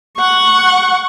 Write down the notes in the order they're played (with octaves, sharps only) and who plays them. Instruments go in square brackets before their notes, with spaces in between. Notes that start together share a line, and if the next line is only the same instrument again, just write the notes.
[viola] F#5 C#6